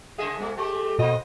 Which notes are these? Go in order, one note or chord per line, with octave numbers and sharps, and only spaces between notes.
C#3 G#4 D#5 E5
A#2 G#3 A3
G#3 A3 G4
B2 A#3 C4 D#5